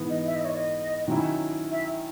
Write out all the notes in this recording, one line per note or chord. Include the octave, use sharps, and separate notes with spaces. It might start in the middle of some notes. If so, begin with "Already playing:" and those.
Already playing: G#2 E3 B3
D#5
E5
D#5
C#5
D#5
D#3 F#3 C#4 E4
E5